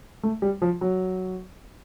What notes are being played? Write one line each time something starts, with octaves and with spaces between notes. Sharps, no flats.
A3
G3
F3
F#3